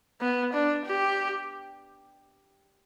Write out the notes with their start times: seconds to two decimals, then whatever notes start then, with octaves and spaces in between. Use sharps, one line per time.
0.21 B3
0.54 D4
0.86 G4